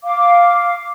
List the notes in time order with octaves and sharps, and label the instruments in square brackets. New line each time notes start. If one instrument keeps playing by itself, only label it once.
[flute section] F5 D6